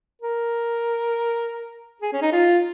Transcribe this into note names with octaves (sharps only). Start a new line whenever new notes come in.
A#4
G#4
C#4
D#4
F4